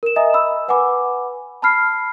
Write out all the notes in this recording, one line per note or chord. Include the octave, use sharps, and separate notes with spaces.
A#4 E7
D#5 E5 G#5 A#5 D#6
B5 E6
B4 F#5 G#5 B5 D6
A5 B5 F6 C7